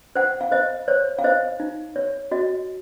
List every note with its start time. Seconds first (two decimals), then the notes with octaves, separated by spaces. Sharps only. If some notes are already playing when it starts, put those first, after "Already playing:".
0.16 C5 F#5
0.41 F5
0.51 C5 D#5
0.88 C5 C#5
1.19 F5
1.24 C5 D#5
1.60 D#4
1.96 C#5
2.31 F#4 D#5